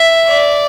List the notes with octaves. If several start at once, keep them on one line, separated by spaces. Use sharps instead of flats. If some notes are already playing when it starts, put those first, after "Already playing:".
Already playing: E5
D5